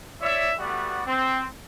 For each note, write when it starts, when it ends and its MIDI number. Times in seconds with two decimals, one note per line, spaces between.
0.22 0.52 64
0.22 0.52 73
0.22 0.52 74
0.22 0.52 76
0.58 1.01 55
0.58 1.01 57
0.58 1.01 59
0.58 1.01 66
0.58 1.01 74
1.06 1.43 60